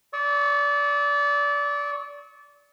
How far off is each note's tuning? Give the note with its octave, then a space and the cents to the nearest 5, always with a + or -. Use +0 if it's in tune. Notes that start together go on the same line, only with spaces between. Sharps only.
D5 -25 C#6 +0 E6 -45